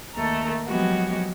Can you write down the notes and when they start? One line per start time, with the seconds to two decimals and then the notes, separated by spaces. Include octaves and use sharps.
0.15 D#2 A3 A#5
0.68 F3 F#3 G#3 B3 F#4 G4